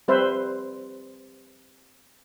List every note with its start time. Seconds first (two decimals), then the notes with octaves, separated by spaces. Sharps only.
0.08 G3 C4 B4 C5 E5